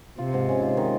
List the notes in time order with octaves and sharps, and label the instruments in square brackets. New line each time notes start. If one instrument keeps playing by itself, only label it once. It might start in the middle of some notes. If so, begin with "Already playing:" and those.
[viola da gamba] C3 [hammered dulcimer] F4
[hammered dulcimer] G#2
C#4
F4
D#3